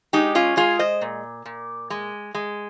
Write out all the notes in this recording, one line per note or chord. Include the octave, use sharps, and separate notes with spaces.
G#3 D#4 G4
C#4 F4
G#3 F4 G#4
C5 D#5
A#2
A#2
G#3
G#3